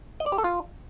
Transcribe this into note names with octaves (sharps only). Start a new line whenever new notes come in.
D#5
D5
G4
A4
F4